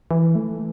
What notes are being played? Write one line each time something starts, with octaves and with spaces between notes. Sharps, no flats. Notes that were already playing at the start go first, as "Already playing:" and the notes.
E3
A3